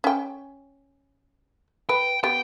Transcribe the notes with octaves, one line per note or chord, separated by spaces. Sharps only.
C#4 G5
B4 G5
B3 G4 G5